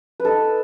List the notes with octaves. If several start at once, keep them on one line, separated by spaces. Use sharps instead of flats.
B4
D#4 A4